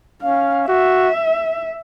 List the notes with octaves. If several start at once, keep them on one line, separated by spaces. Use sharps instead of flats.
C#4 F5
F#4 E5